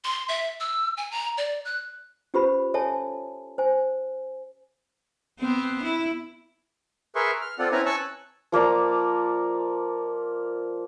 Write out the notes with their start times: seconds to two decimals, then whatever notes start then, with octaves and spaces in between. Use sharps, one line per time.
0.04 C6
0.29 E5
0.60 E6
0.97 G#5
1.11 A#5
1.37 D5
1.65 F#6
2.34 C#4 F4 G4 B4 C5 B5
2.74 A4 C#5 E5 G#5 A5
3.58 C5 G#5
5.40 B3 C4
5.83 E4
7.15 G#4 A#4 B4 E5 C6 C#6
7.41 F6
7.59 C4 F4 A4 D5 F#5
7.72 C4 C#4 E4 B4 G#5 A#5
7.86 G#5 A5 C#6 E6 F#6
8.52 F3 A#3 D5 A#5